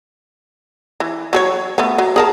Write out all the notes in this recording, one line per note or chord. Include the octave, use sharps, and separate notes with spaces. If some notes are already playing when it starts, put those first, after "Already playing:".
E3
F#3 G#4 C#5
A3 B3
F#3
G#4 A#4 A5